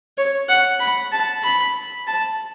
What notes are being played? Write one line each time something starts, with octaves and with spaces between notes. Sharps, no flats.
C#5
F#5
B5
A5
B5
A5